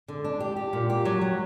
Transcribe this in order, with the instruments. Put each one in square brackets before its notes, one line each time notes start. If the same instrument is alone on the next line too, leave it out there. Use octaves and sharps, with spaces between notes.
[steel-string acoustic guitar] D3
D4
G4
G4
A#2
G4
F#3
F#3